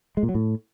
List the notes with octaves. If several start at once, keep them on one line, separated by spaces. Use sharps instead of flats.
G#3
A#2
F#3
A2